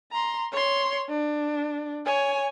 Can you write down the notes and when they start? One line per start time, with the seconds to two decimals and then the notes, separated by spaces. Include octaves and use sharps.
0.12 A#5 C6
0.52 C#5 C6
1.09 D4
2.06 C#5 G#5